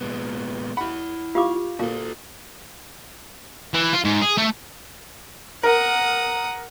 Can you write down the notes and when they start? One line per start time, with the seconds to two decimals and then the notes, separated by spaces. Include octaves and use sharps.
0.01 A#2 G#3 B3
0.77 E4 F#5 B5
1.35 F4 G4 F5 D6
1.79 A#2 F#4 A4
3.74 E3
3.93 F4
4.05 G#2
4.22 G#4
4.38 A3
5.63 A#4 F#5 D#6